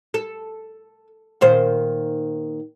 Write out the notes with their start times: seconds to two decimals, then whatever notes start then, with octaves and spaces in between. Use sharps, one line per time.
0.14 A4
1.41 A#2 D#3 C5